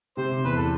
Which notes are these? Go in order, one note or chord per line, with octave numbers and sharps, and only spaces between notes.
C3 C5
E2 B4
A4